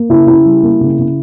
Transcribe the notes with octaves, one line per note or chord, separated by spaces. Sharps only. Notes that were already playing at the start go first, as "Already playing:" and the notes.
Already playing: A#3
C#3 E4
C#3 E4
G3
A#3
C#3
C#3